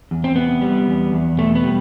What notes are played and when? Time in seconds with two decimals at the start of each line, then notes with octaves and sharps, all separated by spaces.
0.11 E2
0.24 C4
0.36 C3 B3
0.62 G3
0.87 E2
1.12 E2
1.38 B2 A3
1.55 B3
1.64 G3